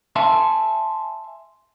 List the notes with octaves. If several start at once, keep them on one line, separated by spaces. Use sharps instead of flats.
E5 G#5 A5 C6